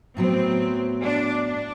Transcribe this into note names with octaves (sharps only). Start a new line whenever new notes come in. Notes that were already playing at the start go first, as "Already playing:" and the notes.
A2 F#3 B3 C4
D4
D4